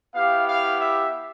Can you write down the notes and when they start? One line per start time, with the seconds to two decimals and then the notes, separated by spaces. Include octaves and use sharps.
0.14 B3 E4 G4 F5
0.48 F5
0.81 E5